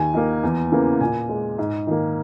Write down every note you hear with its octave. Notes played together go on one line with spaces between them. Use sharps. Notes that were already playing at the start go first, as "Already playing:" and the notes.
Already playing: D#2 G#5
D#3 A#3
E2
C#3 E3 A#3
A#2 G#5
G#3
G#2
D#3 A#3